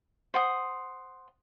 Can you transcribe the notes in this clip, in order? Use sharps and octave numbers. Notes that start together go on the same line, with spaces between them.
C5 F#5 D#6